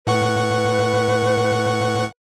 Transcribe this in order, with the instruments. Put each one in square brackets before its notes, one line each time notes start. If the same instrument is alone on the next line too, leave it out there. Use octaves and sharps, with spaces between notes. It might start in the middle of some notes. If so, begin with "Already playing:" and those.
[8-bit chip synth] A2 F#5 C#6 [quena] B4